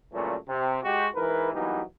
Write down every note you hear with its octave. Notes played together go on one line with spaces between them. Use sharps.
A#2 C#3 E3 F#3 G3 A3
C3
G#3 F#4 G4
G#2 E3 A#4 B4
E3 F#3 G3 A#3 B3 D#4